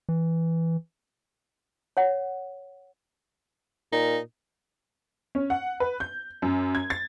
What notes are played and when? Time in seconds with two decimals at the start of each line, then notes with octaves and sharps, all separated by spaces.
0.09 E3
1.97 C#5 F#5
3.92 A#2 D#4
5.35 C#4
5.50 F#5
5.80 B4
6.00 G6
6.42 F#2
6.75 G#6
6.90 A6